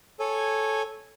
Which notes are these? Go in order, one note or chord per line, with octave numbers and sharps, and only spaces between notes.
A4 C#5 G#5